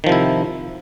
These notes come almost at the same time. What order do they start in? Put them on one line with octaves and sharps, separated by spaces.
D#3 F3 C3 E4